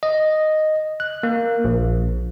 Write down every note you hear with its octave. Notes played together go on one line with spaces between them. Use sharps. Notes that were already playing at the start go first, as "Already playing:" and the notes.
D#5
F#6
A#3
A#1